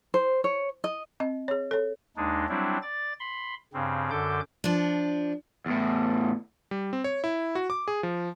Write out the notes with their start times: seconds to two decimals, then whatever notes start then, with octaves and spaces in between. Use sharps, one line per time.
0.14 C5
0.44 C#5
0.84 D#5
1.20 C4 D#5
1.48 G#4 C#5
1.71 A4 C#5
2.17 D#2 G#3 D4 D#4
2.49 F#3 G3 C4 D4 E4
2.82 D5 A6
3.20 B5 C6
3.74 G2 C#3 C4
4.11 F#2 D3 A4 D6 G6
4.64 F3 D4
5.66 E2 A2
6.71 G3
6.93 C4
7.04 C#5
7.24 E4
7.55 F#4
7.70 D6
7.88 G#4
8.03 F3